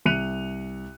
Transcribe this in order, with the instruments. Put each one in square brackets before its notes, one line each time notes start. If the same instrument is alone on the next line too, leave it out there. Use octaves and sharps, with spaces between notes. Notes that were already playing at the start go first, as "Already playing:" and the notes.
[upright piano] C2 F#6 C#7 D#7 F7